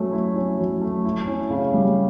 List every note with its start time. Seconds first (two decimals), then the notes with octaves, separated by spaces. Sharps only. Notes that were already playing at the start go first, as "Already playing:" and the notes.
Already playing: F#3 A3 C#4
0.12 E4
0.36 C#4
0.58 F#3
0.81 A3
1.05 E4
1.27 C#4
1.50 C#3
1.74 G3